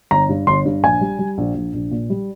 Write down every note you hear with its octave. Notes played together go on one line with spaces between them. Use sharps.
G1 A#5
G2
G1 C6
G2
A#1 G#5
G3
G3
A#1
A#1
A#1
A#2
G3